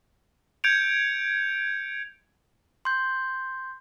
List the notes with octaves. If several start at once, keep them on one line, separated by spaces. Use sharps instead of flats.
G6 G#6 C#7 D7 F7
C6 G6